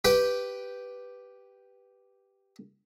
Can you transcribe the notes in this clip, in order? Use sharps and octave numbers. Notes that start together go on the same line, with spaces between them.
G4 B4 G5